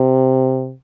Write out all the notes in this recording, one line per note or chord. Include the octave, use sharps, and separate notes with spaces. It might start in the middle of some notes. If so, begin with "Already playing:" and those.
Already playing: C3